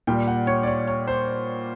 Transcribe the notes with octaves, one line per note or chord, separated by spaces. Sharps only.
A#2 G3 G5
F#5
C#5
D5
C#5
C#5
C5